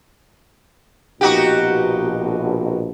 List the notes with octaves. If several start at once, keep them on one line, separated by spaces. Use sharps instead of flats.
A#1 B2 D#4 F#4 G4